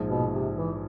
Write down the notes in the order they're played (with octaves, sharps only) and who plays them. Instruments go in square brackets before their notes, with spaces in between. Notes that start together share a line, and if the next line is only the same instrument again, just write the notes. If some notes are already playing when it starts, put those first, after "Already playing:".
Already playing: [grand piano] A#1 G#2 F3 G#3
[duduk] B2
C3
E3